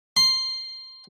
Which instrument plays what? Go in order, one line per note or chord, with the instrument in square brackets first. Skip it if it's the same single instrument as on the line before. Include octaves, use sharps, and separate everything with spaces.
[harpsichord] C6